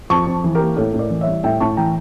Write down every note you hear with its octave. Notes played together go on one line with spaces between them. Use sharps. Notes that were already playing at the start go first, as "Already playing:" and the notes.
F2 A5 C#6
F2
E3
G4 A#4
A#3
A2 A4 C#5
A2
A#4 D5
E3
C#5 E5
G3
A2 E5 G5
A2 A5 C#6
E3 G5 A#5